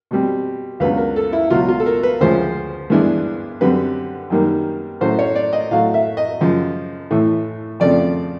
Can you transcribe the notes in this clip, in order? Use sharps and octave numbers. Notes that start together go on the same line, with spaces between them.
B2 G3 C4
C#2 C#3 F#3 B3 D4 B4
A#4
A4
E4
C#2 B2 F#3 F4
F4
A4
A#4
B4
D2 C#3 F3 G#3 C#4 C5
G2 E3 G#3 B3 D4
F#2 D3 G3 C4 B4
F#2 D#3 G3 A#3
A2 F#3 A3 C#4 C5
C#5
D5
D#5
A2 F#3 A3 F5
E5
D#5
F#2 C#3 F3
A2 E3 A3
F2 C#3 F3 A3 C4 D5